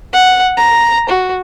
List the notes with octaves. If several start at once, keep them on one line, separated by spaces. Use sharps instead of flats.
F#5
A#5
F#4